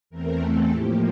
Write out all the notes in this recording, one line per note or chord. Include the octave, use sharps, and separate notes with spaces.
E2 E3 A3 C4 A#4
A4
A2 F3 A#3 G4